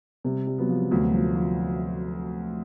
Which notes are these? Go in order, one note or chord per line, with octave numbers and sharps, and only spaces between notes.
C3 G3
G3
F#3 B3
F3
D2 F#3
F3
A3
F3